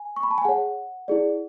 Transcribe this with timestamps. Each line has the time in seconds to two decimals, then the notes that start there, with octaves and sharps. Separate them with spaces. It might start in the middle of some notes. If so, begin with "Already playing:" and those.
Already playing: G#5
0.16 C#6
0.23 B5
0.31 A5
0.38 G#5
0.45 G#4 C#5 F#5
1.08 E4 G#4 D5